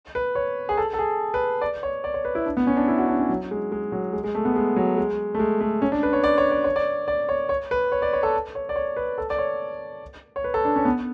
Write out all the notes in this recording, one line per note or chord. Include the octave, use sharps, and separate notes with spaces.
B4
C#5
G#4
A4
A4
G#4
B4
D5
C#5
D5
C#5
B4
E4
D4
B3
C#4
D4
E4
F#4
D4
C#4
F#3
G#3
G#3
F#3
G#3
G#3
A3
B3
G#3
F#3
G#3
A3
G#3
A3
C#4
D4
B4
C#5
D5
C#5
D5
C#5
D5
D5
C#5
C#5
B4
C#5
D5
C#5
A4
C#5
D5
C#5
B4
A4
D5
C#5
C#5
B4
A4
D4
C#4
B3